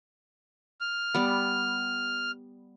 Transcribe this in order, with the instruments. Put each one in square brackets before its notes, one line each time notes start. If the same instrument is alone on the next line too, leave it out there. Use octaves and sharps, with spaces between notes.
[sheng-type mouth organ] F6
[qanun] G3 B3